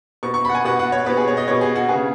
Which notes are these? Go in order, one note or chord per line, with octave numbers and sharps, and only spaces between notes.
B2 B3 C#6
C#6
B5
F#5
G#5
B2 B3 F#5
F#5
C#5
B2 B3 B4
G#4
C#5
D#5
B2 B3 C#5
G#4
F#4
C#3 B3 G#4